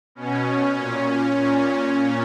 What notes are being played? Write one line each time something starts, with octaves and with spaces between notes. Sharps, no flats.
B2 C#4
A#2
A#2
A#2